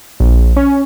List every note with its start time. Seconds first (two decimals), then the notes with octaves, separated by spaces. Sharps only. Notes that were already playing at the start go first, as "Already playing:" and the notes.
0.20 A#1
0.56 C#4